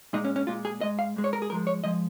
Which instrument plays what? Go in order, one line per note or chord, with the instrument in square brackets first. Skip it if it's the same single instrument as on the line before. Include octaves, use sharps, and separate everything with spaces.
[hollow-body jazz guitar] A#2 G#3 D#4
C#4
C#4
A#2 G#3 F4
G#4
G#2 G#3 D#5
F5
G#2 G#3
C#5
A#4
G#4
G#2 F3 G#3 A#4
C#5
F3 G#3 D#5